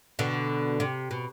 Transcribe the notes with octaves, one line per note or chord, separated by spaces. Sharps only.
B2 D3
C3
B2